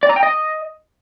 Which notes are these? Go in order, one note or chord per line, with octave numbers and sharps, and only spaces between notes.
D5
A#5
G5
D#5